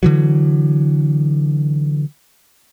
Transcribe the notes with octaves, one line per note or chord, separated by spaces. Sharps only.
D3 E3 F#3